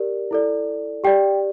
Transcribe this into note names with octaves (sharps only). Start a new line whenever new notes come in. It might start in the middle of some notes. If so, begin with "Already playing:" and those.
Already playing: G4 A#4 D5
E4 A4 D5
G4 D5 G5